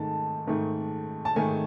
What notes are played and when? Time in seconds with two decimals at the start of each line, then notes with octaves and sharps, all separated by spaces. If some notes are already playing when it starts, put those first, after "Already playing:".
Already playing: G#2 D#3 A3 A5
0.47 G#2 D#3 A3
1.25 A5
1.36 G#2 D#3 A3 G#5